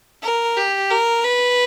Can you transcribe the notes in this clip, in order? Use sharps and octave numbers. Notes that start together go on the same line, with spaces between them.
A#4
G4
A#4
B4